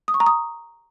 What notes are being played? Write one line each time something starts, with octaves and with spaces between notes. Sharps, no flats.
D#6
C#6
A#5
D#6